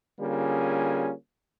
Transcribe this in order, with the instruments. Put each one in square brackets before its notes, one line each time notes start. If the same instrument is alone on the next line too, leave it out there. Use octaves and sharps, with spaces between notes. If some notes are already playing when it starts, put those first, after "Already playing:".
[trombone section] D3 G3 A#3 C#4 F4 G#4